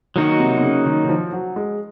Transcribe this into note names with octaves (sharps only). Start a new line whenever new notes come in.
D#3 F#3 A#3 D#4 F#4
C3
C3
C#3
D#3
D#3
F3
F#3
G#3